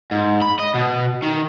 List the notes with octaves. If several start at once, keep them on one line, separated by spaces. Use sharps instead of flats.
G#2
B5
D#5
B2
D#3